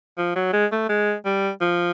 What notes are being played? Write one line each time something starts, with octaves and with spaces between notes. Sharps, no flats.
F3
F#3
G#3
A3
G#3
G3
F3